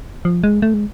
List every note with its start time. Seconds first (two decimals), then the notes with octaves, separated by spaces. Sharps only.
0.25 F3
0.44 G#3
0.62 A3
0.74 G#3